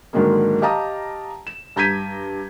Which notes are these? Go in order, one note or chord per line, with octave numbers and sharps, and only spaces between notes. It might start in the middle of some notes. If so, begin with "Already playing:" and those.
G#2 D3 D#3 F#3 G#3 A#3
G4 D#5 F5 A5 A#5 D#6
E7
G2 A#5 G6 G#6 B6 D#7